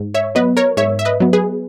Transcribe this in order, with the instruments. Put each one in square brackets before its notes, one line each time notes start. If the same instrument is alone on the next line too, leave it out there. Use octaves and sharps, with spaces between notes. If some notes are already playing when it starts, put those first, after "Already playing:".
Already playing: [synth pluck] G#2
C#5 E5
F#3 B3 B4 D#5
A#4 C#5
G#2 C#5 E5
E5
B4 D#5
F#3 B3
G#4 B4